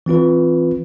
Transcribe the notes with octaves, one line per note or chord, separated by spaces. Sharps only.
E3 C4 F4 B4